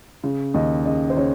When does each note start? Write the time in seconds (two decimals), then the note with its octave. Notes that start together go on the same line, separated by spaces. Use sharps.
0.24 C#3
0.54 D#2 D#5
0.85 C#3 D#5
1.10 C5
1.17 C#3 C#5